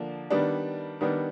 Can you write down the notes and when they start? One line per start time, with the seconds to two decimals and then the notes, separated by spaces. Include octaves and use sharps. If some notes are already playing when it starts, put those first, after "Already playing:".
Already playing: D3 F3 A#3 D4
0.30 D#3 G3 B3 D4
1.01 D#3 G3 B3 D4